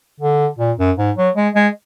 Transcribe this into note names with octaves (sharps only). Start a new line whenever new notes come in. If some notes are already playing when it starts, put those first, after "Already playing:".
D3
A#2
F#2
G#2
F#3
G#3
G#3